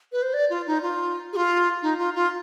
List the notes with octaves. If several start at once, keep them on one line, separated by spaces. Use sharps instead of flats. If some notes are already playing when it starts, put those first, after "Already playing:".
B4
C5
D5
F4
D#4
F4
G#4
F4
D#4
F4
F4